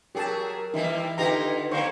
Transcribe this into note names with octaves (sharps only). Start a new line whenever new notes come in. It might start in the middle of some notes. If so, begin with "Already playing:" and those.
F#3 G4 G#4 A#4 A5
E3 G3 A#3 D#4 E5
D3 D#4 F4 G4 B4 A#5
D3 A#3 C5 F5 C#6